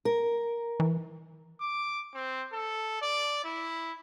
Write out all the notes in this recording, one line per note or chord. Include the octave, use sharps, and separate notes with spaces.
A#4
E3
D6
C4
A4
D5
E4